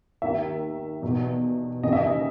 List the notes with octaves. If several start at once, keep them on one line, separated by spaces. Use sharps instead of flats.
D#2 D#3 E5
E2 B2
D#2 C#3 E3 D#5
E5
D#5